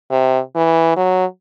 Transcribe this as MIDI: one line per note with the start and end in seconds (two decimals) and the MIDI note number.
0.10 0.40 48
0.56 0.94 52
0.96 1.25 54